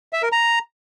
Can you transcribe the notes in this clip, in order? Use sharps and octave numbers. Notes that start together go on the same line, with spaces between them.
E5
A#4
A#5